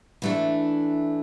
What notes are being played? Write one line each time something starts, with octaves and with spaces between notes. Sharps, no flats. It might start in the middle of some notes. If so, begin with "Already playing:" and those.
E3 A3 D4